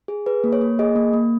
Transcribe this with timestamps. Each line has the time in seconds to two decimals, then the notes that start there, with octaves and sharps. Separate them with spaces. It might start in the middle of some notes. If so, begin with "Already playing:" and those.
0.08 G#4
0.26 G#4 B4
0.44 A#3
0.53 C#5
0.61 A#3
0.79 G#4 D#5
0.96 A#3
1.13 A#3